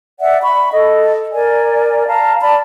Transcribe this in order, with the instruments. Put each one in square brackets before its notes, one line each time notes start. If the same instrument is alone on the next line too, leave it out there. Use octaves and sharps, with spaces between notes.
[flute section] D5 E5 F#5
B5 C#6
A4 D#5
A#4 D5 G#5
F5 A5 A#5
D5 A5 B5